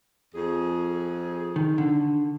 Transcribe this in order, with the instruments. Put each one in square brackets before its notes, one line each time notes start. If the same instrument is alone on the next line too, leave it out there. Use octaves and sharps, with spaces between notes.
[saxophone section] F2 G#4
[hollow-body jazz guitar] D#3
D3